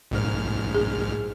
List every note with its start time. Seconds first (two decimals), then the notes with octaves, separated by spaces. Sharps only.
0.11 A#1 G#2 F6
0.74 G#4